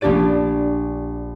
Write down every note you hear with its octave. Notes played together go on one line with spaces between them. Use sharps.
A#1 A#3 D4 G4 D5 D#7